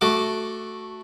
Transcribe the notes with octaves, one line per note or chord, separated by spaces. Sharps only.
A3 F#4 D6